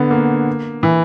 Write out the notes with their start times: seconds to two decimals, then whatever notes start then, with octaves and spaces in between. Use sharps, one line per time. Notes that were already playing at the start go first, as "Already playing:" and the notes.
Already playing: D3 B3
0.11 A#3
0.83 E3